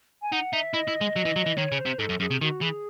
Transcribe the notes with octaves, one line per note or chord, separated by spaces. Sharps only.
G#5
D#4 F#5
D#4 E5
E4 D#5
E4
G#3
F#3
E3
F#3
E3
D#3 C#5
C#3
C5
C3
G#2 A4
F#2
F#2 G#4
C3
D#3 F#4
E3 G#4